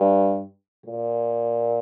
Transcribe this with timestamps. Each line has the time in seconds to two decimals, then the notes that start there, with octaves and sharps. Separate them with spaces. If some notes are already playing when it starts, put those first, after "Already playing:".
Already playing: G2
0.86 A#2